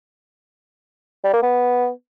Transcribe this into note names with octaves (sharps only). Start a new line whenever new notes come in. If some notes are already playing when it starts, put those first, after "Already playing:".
G3
A#3
B3